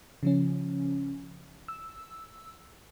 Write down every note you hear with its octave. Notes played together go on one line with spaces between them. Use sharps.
C#3 F3 C#4
E6